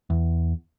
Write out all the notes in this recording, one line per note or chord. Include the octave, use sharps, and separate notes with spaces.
E2